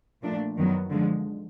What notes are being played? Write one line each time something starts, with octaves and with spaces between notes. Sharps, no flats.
A#2 F3 A3 D4
F#2 D#3 F#3 B3
D3 F3 G#3